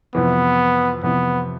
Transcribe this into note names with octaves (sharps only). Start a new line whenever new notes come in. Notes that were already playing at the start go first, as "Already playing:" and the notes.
F2 C3 E3 B3
F2 C3 E3 B3